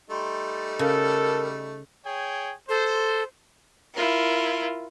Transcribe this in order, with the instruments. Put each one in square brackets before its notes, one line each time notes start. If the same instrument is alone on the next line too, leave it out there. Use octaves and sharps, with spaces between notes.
[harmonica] G3 A3 D#4 [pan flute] C6
[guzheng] C#3 [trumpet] A4 [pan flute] A#4
[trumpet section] G#4 C#5 G5
[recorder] A4 [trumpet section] C5
[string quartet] E4 F4 A#4